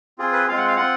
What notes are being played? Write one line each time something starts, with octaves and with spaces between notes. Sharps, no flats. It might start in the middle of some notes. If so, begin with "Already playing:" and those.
C4 F4 G#4
B4
G#3 C4 F4 F5
F#5
F5
C4 F4 F#5